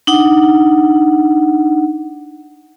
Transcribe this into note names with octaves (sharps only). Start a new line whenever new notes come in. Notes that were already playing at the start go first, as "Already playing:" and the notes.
D4 D#4 F#5